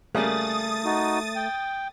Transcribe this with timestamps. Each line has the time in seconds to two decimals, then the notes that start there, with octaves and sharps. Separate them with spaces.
0.15 C#3 G3 A3 A#3 D#6 A6
0.85 D#4 F#4
1.36 G5